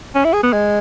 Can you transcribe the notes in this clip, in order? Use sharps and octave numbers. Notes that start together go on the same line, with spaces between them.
C#4
E4
G#4
B3
G#3